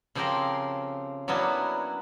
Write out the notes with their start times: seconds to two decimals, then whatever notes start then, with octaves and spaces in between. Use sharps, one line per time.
0.15 C#3 F3 C4 G4 A#4 G5
1.28 F#3 A#3 B3 C#4 D4 E4